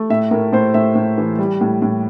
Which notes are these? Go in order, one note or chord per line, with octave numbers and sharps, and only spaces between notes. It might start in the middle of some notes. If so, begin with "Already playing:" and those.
Already playing: A3
A2 E5
A2 A#4
A2 C5
A2 E5
A2
E3
G3
A2
A2